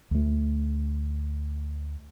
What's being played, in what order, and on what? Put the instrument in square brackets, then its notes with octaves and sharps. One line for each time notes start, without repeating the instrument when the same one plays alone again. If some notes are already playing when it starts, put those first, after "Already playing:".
[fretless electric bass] D2 A3